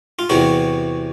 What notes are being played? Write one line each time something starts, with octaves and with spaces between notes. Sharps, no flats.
F4
E2 C3 E3 F#4